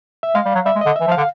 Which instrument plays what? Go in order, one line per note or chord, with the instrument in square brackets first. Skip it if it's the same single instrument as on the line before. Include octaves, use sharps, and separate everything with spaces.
[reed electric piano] E5
[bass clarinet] G#3 [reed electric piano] F5
[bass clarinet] G3
F#3
[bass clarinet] G3 [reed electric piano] E5
[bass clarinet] G#3
[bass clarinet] D3 [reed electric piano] D#5
[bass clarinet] E3 [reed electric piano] E5
[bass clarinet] F3
[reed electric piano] F5
[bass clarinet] D3